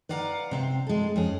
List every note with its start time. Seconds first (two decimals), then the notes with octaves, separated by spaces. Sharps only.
0.09 B4 D5 F5 F#5 A5 A#5
0.51 C3 C4 F5
0.87 G#3 A4
1.16 F2 C#4 G#4